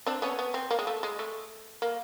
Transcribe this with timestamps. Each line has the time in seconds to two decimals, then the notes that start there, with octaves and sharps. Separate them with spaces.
0.06 C4 D4
0.22 B3 C#4
0.39 B3
0.54 C4
0.71 A#3
0.79 G#3
0.87 A3
1.03 G#3
1.19 A3
1.82 A#3